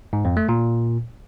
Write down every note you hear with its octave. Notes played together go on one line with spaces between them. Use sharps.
G#2
F2
A3
A#2